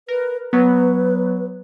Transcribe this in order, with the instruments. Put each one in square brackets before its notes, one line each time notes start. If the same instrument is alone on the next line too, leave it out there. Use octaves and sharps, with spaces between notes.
[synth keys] A#4 [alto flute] B4
[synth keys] F#3 B3 [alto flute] B4